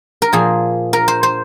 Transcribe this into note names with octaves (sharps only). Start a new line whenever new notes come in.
A#4
A#2 F3 G#4
A#4
C5
C5